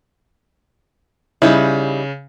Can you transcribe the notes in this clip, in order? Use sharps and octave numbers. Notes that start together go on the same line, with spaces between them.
C#3 G3 D#4 E4